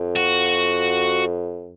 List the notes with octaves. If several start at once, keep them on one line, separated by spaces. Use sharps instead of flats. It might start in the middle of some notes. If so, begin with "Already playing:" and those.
Already playing: F2
F#4